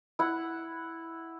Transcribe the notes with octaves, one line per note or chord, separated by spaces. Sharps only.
E4 F#5